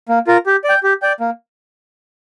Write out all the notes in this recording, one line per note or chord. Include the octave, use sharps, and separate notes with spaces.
A#3
F4 A#4
G4
D5 G5
G4
D5 G5
A#3